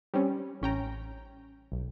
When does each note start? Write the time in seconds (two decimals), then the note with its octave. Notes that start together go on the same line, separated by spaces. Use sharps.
0.14 G3 C4 C#4
0.61 A1 C#4 G5 A#5
1.72 B1